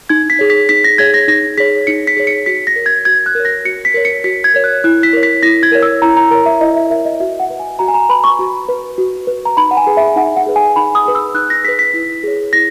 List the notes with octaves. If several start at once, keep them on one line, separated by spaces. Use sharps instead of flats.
D#4 G#6
B6
G#4 C#5
B6
D#4 B6
A#6
G#4 C#5 G#6
A#6
D#4 A#6
G#4 C#5 B6
D#4 C#7
B6
G#4 C#5
C#7
F#4 B6
A#6
A#4 C#5
G#6
F#4 G#6
F#6
A#4 C#5
A#6
F#4 C#7
B6
A#4 C#5
C#7
F#4 B6
G#6
A#4 C#5
F#6
E4 F#6
B6
A#4 C#5
B6
E4 A#6
G#6
A#4 C#5
E6
E4 A#5
A#5
A#4 C#5 A#5
E5
E4 D#5
E5
A#4 C#5 E5
D#5
F#4 E5
F#5
B4
G#5
F#4 A#5
G#5
A#5
B4 B5
C#6
F#4
B4
F#4
B4
A#5
D#4 B5
F#5
G#5
G#4 B4
E5
D#4 F#5
F#5
G#4 B4
G#5
D#4 B5
D#6
G#4 B4
E6
D#4 F#6
A#6
G#4 B4 B6
B6
E4
G#4 C#5
E4 A#6